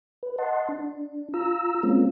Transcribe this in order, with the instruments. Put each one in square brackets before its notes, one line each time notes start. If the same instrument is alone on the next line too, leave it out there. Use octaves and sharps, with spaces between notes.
[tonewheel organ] B4
D#5 F#5 A5 C6
D4
F4 A#5 E6
G#3 A#3 C4 C#4 F4